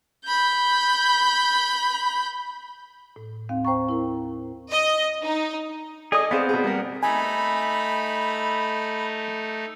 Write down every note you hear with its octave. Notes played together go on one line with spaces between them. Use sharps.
B5 G6
A2
D#2 C4 F5
C5 G5 A#5 C#6
E4 A#4
D#5
D#4
G#4 A4 D5 D#5 D#6
B3 C4 G#4 C5 D5 F5
B2 G#4
G3 A#3 A#4
A3 D#4 G#5 B5